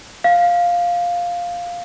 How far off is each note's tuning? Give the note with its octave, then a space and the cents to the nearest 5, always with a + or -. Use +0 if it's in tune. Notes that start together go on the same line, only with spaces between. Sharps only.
F5 +5